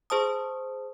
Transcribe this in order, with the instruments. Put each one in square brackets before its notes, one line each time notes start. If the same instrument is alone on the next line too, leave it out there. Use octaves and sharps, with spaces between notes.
[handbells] G#4 C5 A5 D#6